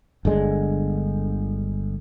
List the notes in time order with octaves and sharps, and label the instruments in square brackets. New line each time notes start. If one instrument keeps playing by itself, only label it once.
[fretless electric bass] G1 D3 G#3